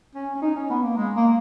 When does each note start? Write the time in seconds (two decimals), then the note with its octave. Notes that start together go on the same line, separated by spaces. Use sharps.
0.15 C#4
0.35 C#4
0.42 D#4
0.56 C#4
0.70 B3
0.83 A#3
0.97 G#3
1.15 A#3